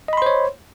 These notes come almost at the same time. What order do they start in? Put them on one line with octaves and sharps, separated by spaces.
D#5 B5 C6 C5 C#5